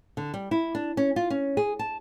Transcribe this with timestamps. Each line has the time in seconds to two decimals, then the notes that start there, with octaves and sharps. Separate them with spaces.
0.17 D3
0.34 G3
0.51 E4
0.75 D4
0.97 C#4
1.16 F4
1.30 C#4
1.57 G#4
1.79 A5